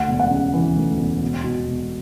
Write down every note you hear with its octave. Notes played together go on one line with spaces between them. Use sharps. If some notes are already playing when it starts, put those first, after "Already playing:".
Already playing: D2 F#5
E1
F#5
C#3
E3
D2
E1
B2
B2
E1